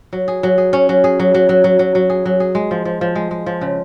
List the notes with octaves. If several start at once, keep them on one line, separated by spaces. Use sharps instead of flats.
F#3
G#4
F#3
G#4
C#4
F#3
G#4
F#3
F#3
F#3
F#3
F#3
F#3
G#4
F#3
G#4
G#3
F3
F3
F3
G#3
G#3
F3
C#3